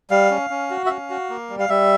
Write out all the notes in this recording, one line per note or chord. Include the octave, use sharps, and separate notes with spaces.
G3 F5
C#4
C#4
F#4
E5
C#4 F5
F#4
A#3
G3
F5
G3 E5